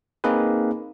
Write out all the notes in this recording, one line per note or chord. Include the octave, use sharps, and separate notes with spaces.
A#3 C4 D#4 G#4 B4